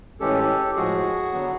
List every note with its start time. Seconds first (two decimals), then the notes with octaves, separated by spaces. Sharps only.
0.20 A2 E3 G#3 C#4 G4 A4
0.76 A2 F3 G#3 F#4 G#4
1.32 D3 F#3 B3